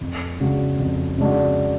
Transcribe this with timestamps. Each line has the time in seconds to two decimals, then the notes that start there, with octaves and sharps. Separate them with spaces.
0.01 F2
0.40 C#3 G#3 D4 F#4
0.79 F2
1.18 C#3 G#3 D4 F#4